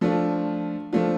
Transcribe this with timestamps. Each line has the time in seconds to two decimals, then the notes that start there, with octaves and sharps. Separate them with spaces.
0.01 F3 A3 D4 F4
0.93 F3 A3 D4 F4